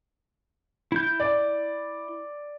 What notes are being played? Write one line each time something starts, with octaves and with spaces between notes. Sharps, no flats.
E4 G6
D5